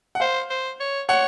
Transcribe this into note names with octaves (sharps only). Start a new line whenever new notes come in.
F#5
C5 F5
C5
C#5
C#5 F#5